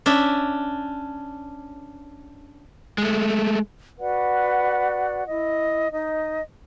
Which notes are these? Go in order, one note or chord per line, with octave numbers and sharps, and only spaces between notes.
C#4 D4 E5
G#3 A3
F#4 B4 D5 F#5
E4 D#5
D#4 D#5